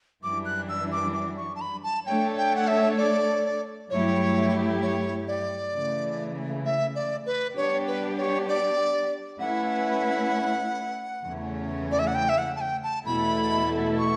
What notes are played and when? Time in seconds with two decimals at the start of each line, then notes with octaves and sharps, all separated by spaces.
0.23 F#2 E3 G3 D4 D6
0.45 F#6
0.69 E6
0.92 D6
1.14 D6
1.37 C#6
1.55 A5
1.61 B5
1.84 A5
2.06 A3 D4 A4 C#5 G5
2.37 G5
2.56 F#5
2.68 E5
2.98 D5
3.89 G2 F#3 A3 E4 G4 C#5
4.82 C#5
5.28 D5
5.73 C#3 E3 A3
6.65 E5
6.95 D5
7.26 B4
7.57 G3 B3 D4 G4 C#5
7.87 B4
8.17 C#5
8.48 D5
9.40 A3 C#4 E4 B4 F#5
11.23 E2 C#3 E3 A3 C#4
11.91 D5
11.99 E5
12.07 F#5
12.15 G5
12.29 E5
12.38 F#5
12.56 A5
12.61 G5
12.83 A5
13.06 E2 B2 A3 E4 A4 B5
13.98 C#6